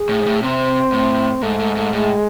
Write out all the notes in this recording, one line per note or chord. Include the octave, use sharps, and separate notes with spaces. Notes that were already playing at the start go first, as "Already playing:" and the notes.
Already playing: G#4
A2
G#2
A2
C3 C4
A2
G#2 A3
G#2
G#2
A2 G#3